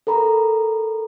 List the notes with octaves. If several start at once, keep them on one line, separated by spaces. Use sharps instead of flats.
A4 A#4 A#5 B5